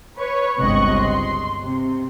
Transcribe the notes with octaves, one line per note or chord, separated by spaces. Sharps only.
B4 C#5
G1 C#2 C3 D#5 C#6 F#6
C6
C3